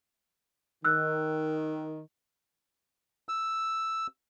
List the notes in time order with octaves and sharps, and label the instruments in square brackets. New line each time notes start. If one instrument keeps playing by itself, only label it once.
[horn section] D#3 [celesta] E6 F#6
[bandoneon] E6